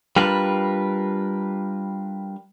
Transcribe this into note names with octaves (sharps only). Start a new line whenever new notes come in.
G3 D4 F4 A#4 B4